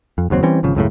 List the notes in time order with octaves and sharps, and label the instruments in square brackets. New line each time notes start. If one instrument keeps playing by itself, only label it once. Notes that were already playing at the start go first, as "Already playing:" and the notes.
[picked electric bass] F2
F#1 D#2 F#3 C4
E3 G3 C4 C#4
G#1 C#3 F3
C#2 F#2 A2 C#3